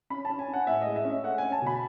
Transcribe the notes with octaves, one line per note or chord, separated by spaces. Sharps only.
C#4 B5
A5
C#4
G#5
C#4
F#5
A2 E5
G#3 D#5
E5
C#4
E5
A3 F#5
C#4 G#5
A5
B2 B5